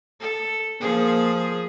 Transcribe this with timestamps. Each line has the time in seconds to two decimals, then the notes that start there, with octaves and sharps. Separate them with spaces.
0.20 A4
0.81 F3 A#3 G#4